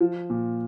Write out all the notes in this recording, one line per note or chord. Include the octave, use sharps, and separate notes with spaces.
F3
A#2